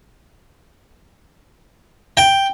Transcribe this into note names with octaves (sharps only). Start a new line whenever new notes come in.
G5